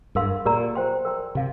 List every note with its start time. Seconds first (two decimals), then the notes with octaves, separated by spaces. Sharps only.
0.15 G2 A#4 F5 C6
0.45 A#2 G4 A#4 D5 A#5
0.75 C5 G5 C6
1.05 A#4 D5 G5 C6
1.35 C3 F5 C6